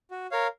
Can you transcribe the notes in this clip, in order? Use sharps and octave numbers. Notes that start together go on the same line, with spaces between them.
F#4
A#4 C#5 F5